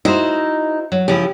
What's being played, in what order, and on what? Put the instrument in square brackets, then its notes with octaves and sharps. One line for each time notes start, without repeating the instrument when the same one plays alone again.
[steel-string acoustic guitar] D#4 [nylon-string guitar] E4 F#4 C5
[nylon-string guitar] F#3
[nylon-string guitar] C#3 F3 E4 [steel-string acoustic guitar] G4